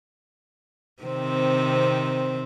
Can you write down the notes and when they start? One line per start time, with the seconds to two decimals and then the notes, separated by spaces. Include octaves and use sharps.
1.03 C3 D#3 C4